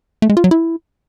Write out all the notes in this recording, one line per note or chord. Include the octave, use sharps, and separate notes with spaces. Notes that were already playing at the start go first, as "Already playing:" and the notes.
A3
G#3
F4
F#3
E4